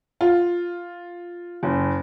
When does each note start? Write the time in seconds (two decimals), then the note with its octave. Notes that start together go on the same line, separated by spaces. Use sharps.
0.21 F4
1.63 F#1